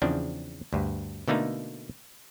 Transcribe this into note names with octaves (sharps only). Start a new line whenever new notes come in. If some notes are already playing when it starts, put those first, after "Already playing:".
E2 C#3 F3 C4 D4
D2 G2
B2 D3 A3 A#3 D#4